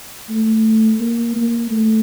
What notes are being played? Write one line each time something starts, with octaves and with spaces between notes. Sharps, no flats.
A3
A#3
A#3
A3